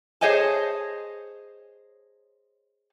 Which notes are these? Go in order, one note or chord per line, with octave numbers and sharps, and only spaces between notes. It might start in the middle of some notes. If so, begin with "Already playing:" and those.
G#4 C5 C#5 D#5 G#5 A5